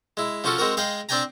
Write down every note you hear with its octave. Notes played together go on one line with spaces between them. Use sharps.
G#3 E4
F3 C#4 F4 F#4 A4
G#3 C4 F#4 A#4
G#3 G#4 D#5 F5 G5
C4 D4 D5 G5 G#5 A#5